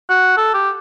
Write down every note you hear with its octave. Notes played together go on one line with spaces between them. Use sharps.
F#4
A4
G4